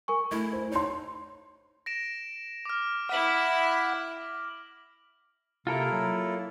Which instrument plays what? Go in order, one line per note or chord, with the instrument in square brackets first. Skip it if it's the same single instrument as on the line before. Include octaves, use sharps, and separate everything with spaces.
[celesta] A#4 G#5 C#6
[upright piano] A3 [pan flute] E4
[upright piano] C5
[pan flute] D#4 [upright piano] C#5 C6
[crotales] A#6 D7 E7
D6 F6
[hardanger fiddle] E4 E5 [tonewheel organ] F#5 [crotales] D6 F#7
[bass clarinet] C3 [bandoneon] A#3 E4 [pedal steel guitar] F4 A4 A#4
[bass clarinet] F#3